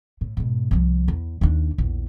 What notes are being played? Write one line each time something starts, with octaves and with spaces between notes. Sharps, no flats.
A2
G#2 B2
C2 F3
E2
D#2 D4
A#1 E2